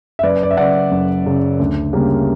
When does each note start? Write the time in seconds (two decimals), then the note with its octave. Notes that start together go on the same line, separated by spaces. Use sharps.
0.19 E5
0.23 F#1 B4 D5
0.43 D5
0.51 E5
0.57 F#2 C#3 D5 F#5
0.92 F#1
1.26 F#2 C#3
1.60 D2
1.93 C#3 G3 A#3